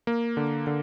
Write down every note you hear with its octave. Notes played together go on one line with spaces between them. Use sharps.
A#3
D3
D3